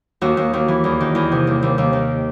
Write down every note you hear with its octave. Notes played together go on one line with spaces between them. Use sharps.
D#2 F#4
D#2
D#2
E3
E2
D#3
E2
C3
D#2
D#2
D#2
D#3